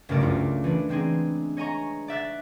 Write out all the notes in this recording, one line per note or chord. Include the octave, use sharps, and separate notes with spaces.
F#1 G2 A3 C#4 A#4 D5
C#2 F4 D5
E3 A3 D4
G#3 C4 D4 D#4 G#4
C#5 D#5 G#5 A#5 C#6
D5 E5 F#6 A6